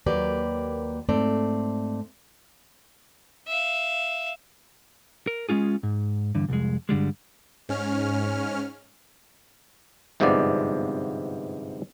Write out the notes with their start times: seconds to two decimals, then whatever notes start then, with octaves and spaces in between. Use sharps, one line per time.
0.06 D#2 F#3 A#3 G4 B4 D5
1.09 G#2 A3 C4 D5
3.48 E5 F5
5.27 A#4
5.49 G#3 B3 C#4 F4 G#4
5.83 G#2
6.35 E2 G2 D3
6.49 C2 F2 G#3
6.89 G2 D3 G3 G#3
7.69 G#2 C#4 F6
10.20 G1 G#2 C3 F3 B3 D5